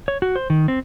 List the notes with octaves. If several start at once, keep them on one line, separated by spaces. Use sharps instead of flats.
C#5
F#4
C5
D#3
C4